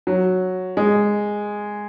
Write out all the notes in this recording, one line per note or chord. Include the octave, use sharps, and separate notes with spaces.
F#3
G#3